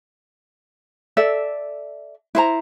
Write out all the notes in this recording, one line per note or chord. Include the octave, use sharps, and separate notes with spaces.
A4 D5 E5
E4 C5 A#5